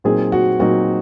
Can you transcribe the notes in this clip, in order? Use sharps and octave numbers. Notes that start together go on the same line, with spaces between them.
A#2 F#3 C4 D#4 G#4
F#4
A#2 F#3 C4 D#4 F#4